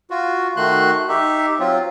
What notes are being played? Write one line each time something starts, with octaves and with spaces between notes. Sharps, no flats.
F4 F#4
D#3 A3 F#4 C6 F#6
D#4 G4 E5
F#3 C4 F4